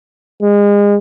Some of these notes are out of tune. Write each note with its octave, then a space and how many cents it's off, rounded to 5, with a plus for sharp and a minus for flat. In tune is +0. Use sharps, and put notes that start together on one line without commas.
G#3 -30